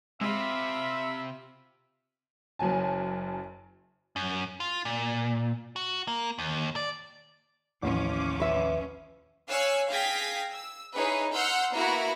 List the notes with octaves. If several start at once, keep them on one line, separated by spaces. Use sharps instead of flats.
C3 G#3 F4 E5 B5
F#1 F#2 F#3 G#5 A5
F#2
F4
A#2
F#4
A#3
D#2
D5
A1 D#2 F3 C#4 D6
B4 E5
C#5 F5 G#5 E6 F#6
G#4 F5 G5 G#6 A#6 B6
E6
D#4 E4 G#4 B4 C#5
F#5 C6 E6 F6 G6
A#3 B3 E4 F#4 A#5 B5